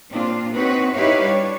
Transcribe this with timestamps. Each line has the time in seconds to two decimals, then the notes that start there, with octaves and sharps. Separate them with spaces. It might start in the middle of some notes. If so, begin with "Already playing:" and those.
0.11 A#2 C4 D4 F4
0.53 C4 D#4 F#4 B4 C#5
0.92 D#4 E4 G4 B4 C#5 F5
1.21 G3 D4 C#5